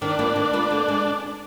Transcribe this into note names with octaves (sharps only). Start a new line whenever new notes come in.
D#3 D4
A#3 F4 B4
D#3
A#3 F4 B4
D3
G#3